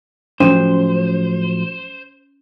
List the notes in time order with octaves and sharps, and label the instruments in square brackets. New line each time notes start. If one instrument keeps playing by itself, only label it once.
[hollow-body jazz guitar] A2 F3 F#3 [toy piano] C#4 [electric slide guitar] C5